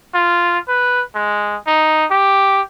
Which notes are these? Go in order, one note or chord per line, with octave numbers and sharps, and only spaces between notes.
F4
B4
G#3
D#4
G4